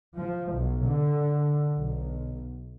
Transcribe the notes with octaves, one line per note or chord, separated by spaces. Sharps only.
F3
B1
D3
B1